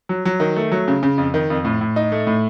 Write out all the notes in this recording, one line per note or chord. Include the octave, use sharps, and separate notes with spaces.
F#3
F#3
D#3
A3
F#3
C#3
C#3
F2
D#3
F2
A2
A2
D#4
A3
A2